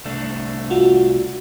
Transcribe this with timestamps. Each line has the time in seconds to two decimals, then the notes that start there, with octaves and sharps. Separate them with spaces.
0.05 C2 A3 D4
0.70 F4 F#4